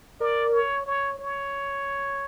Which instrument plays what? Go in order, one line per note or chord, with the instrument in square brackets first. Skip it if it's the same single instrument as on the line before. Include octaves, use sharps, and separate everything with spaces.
[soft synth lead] A#4 [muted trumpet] D5
[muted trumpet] C#5
C#5
C#5